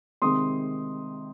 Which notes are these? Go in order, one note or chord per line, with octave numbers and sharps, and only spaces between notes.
C3 D#3 G#3 C4 C6 D#6